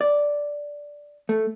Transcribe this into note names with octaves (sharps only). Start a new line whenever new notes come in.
D5
A3